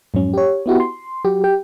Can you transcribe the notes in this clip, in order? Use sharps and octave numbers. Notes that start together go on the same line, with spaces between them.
F2 G#2 F#3 C#4
G4 C#5
B3 E4 F#4 G4
C6
F#3 F#4 G4
G4 G5